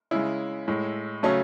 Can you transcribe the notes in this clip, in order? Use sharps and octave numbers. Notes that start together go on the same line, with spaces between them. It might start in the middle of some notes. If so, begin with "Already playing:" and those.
C#3 G#3 E4
A2 G#3
C#3 F#3 A3 C#4